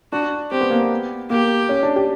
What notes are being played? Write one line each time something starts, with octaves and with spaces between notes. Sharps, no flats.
D4 F#4
C4 G4
B3
A#3
B3
A#3 G4
C#4
D4
G4